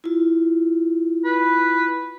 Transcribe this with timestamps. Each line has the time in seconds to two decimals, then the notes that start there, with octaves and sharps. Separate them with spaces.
0.04 E4 F4
1.25 B4